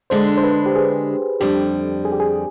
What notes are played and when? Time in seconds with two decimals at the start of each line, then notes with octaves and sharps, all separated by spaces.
0.10 D3 G#3 D4 C5
0.37 C5
0.43 B4
0.66 G4
0.75 G#4
1.40 F2 D3 G3 G4
2.05 G#4
2.12 G4
2.20 G#4